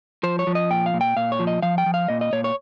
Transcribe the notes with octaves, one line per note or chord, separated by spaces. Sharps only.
F3 C5
C#5
F3
D#5
A#2 G5
F5
A#2
G5
A#2 F5
C#5
F3
D#5
F3 F5
G5
F3
F5
A#2 D#5
D#5
A#2 C#5
C#5